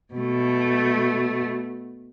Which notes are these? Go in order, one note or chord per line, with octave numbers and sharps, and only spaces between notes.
B2 A3